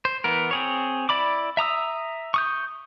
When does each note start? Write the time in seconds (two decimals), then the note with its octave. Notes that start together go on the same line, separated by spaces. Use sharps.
0.05 C5
0.24 E3 B3 A#4
0.51 C4 G#4 C#5
1.09 E4 D5 B5 D6
1.57 E5 A#5 D#6 E6
2.34 C#6 D#6 G6